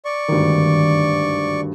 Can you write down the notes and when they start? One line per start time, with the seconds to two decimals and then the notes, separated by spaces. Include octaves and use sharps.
0.05 D5 C#6
0.28 G#1 D2 G2 D#3